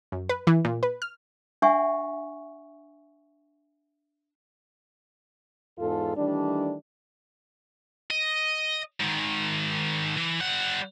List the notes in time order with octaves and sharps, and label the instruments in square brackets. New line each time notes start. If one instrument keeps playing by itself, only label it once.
[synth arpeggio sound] F#2
B4
E3
A#2
B4
F6
[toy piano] D4 E5 F#5 G#5 C#6
[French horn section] E2 G#2 F4 A4
D#3 E3 G3 A3 D4
[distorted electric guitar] D#5
G#2 D#3
E3
G3 F#5